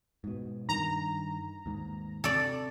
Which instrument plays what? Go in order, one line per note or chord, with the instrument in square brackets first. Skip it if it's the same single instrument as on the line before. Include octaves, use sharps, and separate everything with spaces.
[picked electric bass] G#2 B2
[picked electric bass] G2 D#3 [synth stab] A#5
[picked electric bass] D#2 G#2
[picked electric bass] C3 [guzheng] A4 D5